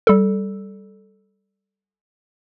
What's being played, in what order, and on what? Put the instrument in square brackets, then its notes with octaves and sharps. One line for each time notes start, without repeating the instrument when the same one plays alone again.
[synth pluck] G3 A4